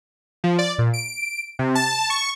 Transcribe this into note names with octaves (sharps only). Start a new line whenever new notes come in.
F3
D5
A#2
D7
C3
A5
C#6